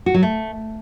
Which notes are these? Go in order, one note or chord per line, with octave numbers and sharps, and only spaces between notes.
F#4
F#3
A3